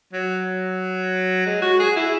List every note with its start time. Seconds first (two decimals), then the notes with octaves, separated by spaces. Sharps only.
0.13 F#3
1.46 G#3
1.62 F#4
1.79 G#4
1.96 E4